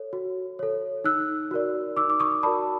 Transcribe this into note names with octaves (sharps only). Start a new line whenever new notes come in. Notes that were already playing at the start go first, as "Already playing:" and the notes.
Already playing: A4 C#5
F#4
A4 C#5
D#4 E6 F#6
F#4 A#4 D5
D#4 D6 E6
D6
C#6 D#6
F#4 A#4 D5 A5 B5